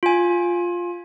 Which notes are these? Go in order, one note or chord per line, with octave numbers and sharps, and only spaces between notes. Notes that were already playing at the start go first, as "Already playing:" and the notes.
F4 G#5